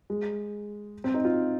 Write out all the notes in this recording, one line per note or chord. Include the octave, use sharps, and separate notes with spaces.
G#3
C4
D#4
F4